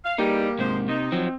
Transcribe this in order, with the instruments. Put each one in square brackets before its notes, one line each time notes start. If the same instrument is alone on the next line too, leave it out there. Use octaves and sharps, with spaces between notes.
[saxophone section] F5
[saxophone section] E2 G3 [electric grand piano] A#3 G4 [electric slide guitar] D#4
[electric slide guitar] G#2 C3 [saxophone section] F3 G#3 C5
[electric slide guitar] C3 [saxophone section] D#4
[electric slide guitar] F3 F#3 [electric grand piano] C4